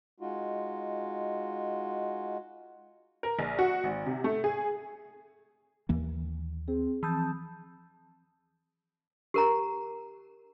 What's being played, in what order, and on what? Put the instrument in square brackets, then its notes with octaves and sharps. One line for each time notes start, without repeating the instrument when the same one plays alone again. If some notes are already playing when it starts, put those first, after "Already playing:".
[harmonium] G#3 D#4 F4 F#4
[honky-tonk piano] A#4
A#1
F#4
G#1
C3
A3
G#4
[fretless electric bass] D#2 E3 A#3
[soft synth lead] C4 [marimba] G#4
[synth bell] E3 D#6 G6 [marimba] F3 C4 [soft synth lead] A5
[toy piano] G4 A#4 A#5